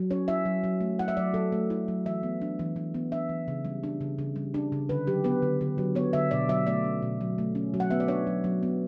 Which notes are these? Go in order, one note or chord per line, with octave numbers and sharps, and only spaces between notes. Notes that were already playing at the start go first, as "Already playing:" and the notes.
Already playing: F#3
C#4 C#5
E4 E5
F#3
F#3
A3
E4 F#5
E5
F#3 D5
F#3 A4
A3
E4
F#3
E3 E5
B3
D4
E3
E3
B3
D4 E5
E3
C#3
G3
D4
C#3
C#3
G3
D4
C#3
D3 B4
F#3 G4
B3 B4
D3
D3
F#3
B3 C#5
D3 E5
B2 D5
F#3 E5
A3 D5
C#4
B2
F#3
A3
C#4
F#3
F#5
B3 E5
D5
D4 C#5
F#3
F#3
B3